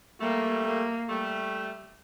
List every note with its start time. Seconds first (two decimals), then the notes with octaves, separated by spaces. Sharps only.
0.21 G3 A3 A#3
0.64 A#3
1.09 G3 A3